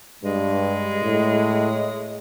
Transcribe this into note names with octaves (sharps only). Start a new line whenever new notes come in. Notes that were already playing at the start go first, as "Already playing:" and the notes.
G2 G#3
A2